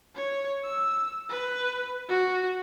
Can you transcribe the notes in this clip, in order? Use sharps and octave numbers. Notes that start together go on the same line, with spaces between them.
C#5
E6
B4
F#4